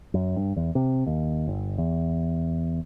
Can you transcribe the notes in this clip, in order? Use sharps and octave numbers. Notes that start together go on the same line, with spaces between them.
F#2
G2
E2
C3
D#2
G1
E2